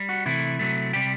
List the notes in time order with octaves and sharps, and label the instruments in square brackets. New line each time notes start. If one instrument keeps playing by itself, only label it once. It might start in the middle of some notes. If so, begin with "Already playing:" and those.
Already playing: [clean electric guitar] G3
F#4
C3 E3 A3 E4
C3 F#3 A3
C3 G3 G4